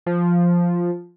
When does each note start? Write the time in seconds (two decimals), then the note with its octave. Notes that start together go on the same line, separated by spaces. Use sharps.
0.06 F3